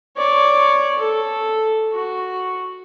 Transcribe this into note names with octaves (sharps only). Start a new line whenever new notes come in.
C#5 D5
A4
F#4